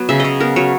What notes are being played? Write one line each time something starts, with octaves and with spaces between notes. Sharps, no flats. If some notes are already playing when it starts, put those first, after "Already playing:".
Already playing: F#3 B3
C#3 E5
C#3 D#5
B3 A#4
F#3 C#5